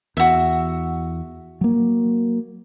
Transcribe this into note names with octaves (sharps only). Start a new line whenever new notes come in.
E2 F#4 E5
F#3 A#3